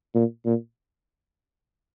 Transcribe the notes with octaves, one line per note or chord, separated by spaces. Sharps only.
A#2
A#2